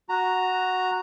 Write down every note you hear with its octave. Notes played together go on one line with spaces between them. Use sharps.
F#4 A#5